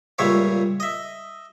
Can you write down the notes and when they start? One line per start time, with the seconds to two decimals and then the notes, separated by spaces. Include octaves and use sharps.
0.18 C#2 A#2 G3 C#5 E5 F5
0.80 D#5 E5